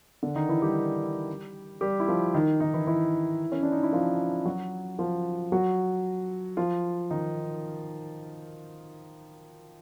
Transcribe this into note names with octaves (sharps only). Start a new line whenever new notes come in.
D3 D4
D#3 D#4
E3 E4
G3 G4
G3 G4
E4
F3 F4
D#3 D#4
D#3 D#4
E3 E4
E3 E4
C#4
D4
D#4
E4
F3 F4
F#3 F#4
F3 F4
F#3 F#4
F3 F4
D#3 D#4